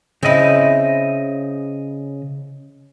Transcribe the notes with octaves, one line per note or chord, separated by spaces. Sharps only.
C#3 C4 E4 D#5